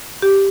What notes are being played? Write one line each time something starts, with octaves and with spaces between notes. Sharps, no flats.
G4